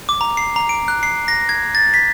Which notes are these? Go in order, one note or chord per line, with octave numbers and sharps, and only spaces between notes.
D6
A#5
C7
A#5
D7
F#6
C7
A#6
G#6
A6
B6